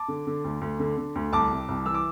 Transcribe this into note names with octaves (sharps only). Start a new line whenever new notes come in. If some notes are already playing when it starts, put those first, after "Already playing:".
Already playing: A5 D6
D3
D3
D2
D2
D3
D3
D2
C2 A5 D6
C3
C2
E3 E6
D6